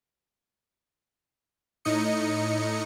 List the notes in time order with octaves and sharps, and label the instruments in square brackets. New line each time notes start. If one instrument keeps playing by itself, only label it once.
[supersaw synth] A2 D#4 D#5 C#7